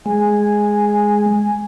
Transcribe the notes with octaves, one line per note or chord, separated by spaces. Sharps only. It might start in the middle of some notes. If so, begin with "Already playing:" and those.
G#3 G#5